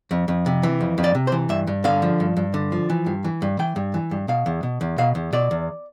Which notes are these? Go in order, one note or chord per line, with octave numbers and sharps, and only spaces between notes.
F2
F2
C3
E3
F2
F2
D5
C3
C5
E3
G2 E5
G2
D3 F5
F3
G2
G2
D3
F3
E3
G2
E3
G2
E3 G5
G2
E3
G2
B2 F5
E2
B2
E2
B2 F5
E2
B2 D5
E2